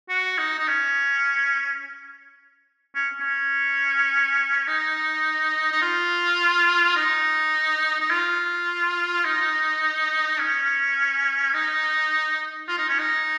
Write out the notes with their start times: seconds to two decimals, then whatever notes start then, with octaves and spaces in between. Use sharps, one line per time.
0.09 F#4
0.38 D#4
0.58 D#4
0.68 C#4
2.95 C#4
3.21 C#4
4.67 D#4
5.72 D#4
5.82 F4
6.96 D#4
8.00 D#4
8.10 F4
9.25 D#4
10.39 C#4
11.54 D#4
12.68 F4
12.78 D#4
12.89 C#4
12.99 D#4